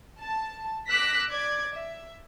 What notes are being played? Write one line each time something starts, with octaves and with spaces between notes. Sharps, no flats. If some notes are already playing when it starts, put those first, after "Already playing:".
A5
D6 E6 F#6 A#6 B6
D5 D6 G#6
E5